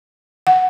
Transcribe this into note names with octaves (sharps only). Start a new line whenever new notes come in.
F#5